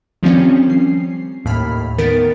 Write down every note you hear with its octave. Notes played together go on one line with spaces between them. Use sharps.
D#3 F3 G3 C4 C#4
C7
D#2 A2 B5 F6 B6
D#3 B3 A#4 A6 B6 D7